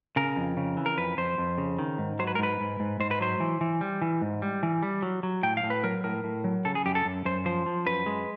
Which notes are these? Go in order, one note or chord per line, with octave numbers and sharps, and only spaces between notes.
C#3 A#4
F2
C#3
E3
A#4
F2 B4
F2 C5
F2
C#3
D#3
G#2
F#3 C5
B4
A#4
G#2 B4
G#2
G#2
G#2 C5
B4
F#3 C5
E3
E3
G3
E3
G#2
G3
E3
G3
F#3
F#3
A2 G5
F5
A2
B4
F#3 A#4
A2 A#4
A2
F#3
C#3 A4
G#4
F#2 G4
A4
F#2
F#2 C5
F3 C5
F3
F#2 B4
G#3